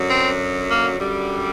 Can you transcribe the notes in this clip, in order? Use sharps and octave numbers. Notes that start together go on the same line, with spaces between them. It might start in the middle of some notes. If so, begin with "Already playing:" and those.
Already playing: F#2 D3 F#3
C4
A#3
F#2 D3 G3